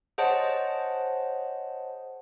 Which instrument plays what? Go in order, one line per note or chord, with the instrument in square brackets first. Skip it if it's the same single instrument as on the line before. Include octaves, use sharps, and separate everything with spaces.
[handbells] G#4 C5 C#5 D#5 F#5 A5